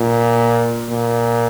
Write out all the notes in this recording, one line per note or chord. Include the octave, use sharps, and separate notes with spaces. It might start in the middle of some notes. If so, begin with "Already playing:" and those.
Already playing: A#2
A#2